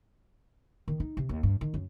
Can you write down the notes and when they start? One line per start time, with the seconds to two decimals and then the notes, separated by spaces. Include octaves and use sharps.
0.88 D#3
1.00 D#4
1.17 C3
1.29 D#2
1.43 G2
1.61 D#3
1.74 F#2